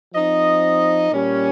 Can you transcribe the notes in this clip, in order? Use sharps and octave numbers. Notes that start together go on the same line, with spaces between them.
F3 C4 D#4 D#5
A#2 G3 C#4